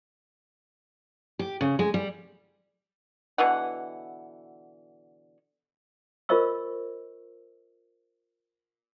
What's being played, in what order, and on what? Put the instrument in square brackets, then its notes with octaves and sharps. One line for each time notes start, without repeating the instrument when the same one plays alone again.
[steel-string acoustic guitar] G4
C#3
G#3
G3
[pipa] B2 D3 E3 F#5
[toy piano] F4 A#4 C5 D#5 C#6 E6